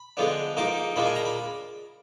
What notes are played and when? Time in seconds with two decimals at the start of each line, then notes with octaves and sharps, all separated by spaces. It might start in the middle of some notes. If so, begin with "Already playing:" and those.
Already playing: B5
0.17 D3 F3 G#3 B3 D4
0.57 G#2 F3 A#3 D#4 D6
0.96 A#2 F3 G#3 D4 B5
1.06 G#5
1.15 A#5
1.25 B5